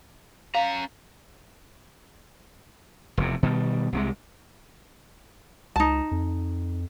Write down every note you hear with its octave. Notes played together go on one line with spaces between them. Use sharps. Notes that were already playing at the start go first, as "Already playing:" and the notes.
C#4 F5 A#5
F1 E2 C3
B2 D#3 G3
C2 C3 G#3
C#2 D#4 A5
F2